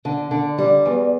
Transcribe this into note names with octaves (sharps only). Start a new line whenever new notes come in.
D3
D3
G3
E2